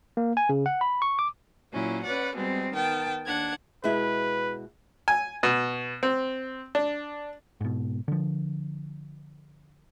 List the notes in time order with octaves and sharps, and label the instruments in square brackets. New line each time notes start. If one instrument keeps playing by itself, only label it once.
[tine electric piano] A#3
G#5
C#3
F#5
B5
C#6
D6
[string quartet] A#2 F#3 C#4 E4
C#4 B4 D5 F#5
B2 G3 G#3 C4
D#3 B3 G5 A5
D#2 D4 F#5 G#6
[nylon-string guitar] B2 G#3 E4 [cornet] B4
[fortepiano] G#5
B2
C4
D4
[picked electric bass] G#2 B2
D3 F3